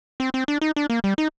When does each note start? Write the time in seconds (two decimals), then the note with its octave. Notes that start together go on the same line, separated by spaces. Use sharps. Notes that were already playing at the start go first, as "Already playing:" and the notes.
0.20 C4
0.34 C4
0.48 D4
0.61 D#4
0.76 D4
0.90 A#3
1.04 G3
1.18 D#4